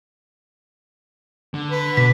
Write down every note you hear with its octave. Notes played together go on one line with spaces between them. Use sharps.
D3
B4
B2 B6